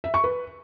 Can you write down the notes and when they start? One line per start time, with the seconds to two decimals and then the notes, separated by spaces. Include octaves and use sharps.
0.04 E5
0.14 C#6
0.24 B4